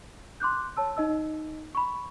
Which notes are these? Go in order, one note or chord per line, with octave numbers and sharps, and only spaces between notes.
C6 D6 F#6 G6
C#5 A5 E6
D#4 D#5 E6
B5 C#6